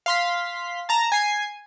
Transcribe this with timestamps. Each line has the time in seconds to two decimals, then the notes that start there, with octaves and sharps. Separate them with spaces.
0.06 F5 C6 B6
0.89 A5 A#5
1.12 G#5 C7